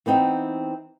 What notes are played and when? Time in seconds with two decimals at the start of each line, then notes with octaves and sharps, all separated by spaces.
0.06 E3 B3 C4 D#4